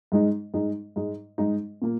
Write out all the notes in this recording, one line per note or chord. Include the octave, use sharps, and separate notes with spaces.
G#2 G#3 D#4
G#2 G#3 D#4
G#2 G#3 D#4
G#2 G#3 D#4
A#2 A#3